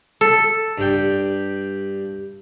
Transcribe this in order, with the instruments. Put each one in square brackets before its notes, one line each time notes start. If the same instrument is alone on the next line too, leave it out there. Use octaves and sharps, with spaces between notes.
[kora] A4
[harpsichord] G2 G5